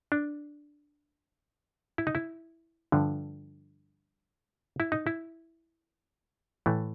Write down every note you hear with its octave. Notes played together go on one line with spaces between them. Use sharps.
D4
E4
D#4
E4
G2 D3 F3
E4
D#4
E4
A2 E3 A3